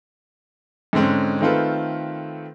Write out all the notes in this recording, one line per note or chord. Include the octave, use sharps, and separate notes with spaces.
G#2 D3 G#3 C4 C#4
D#3 A3 C4 F4 A4 B4